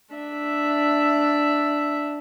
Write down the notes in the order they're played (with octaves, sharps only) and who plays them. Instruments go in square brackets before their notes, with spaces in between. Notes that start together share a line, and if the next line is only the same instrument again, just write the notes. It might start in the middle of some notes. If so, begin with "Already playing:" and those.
[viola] D4 E5